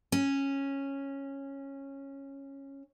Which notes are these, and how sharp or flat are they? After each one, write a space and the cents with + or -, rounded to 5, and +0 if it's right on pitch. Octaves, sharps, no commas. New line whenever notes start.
C#4 -10